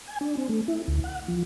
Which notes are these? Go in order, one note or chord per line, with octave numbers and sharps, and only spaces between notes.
G#5
D4
C4
A3
E4
D2
F#5
F3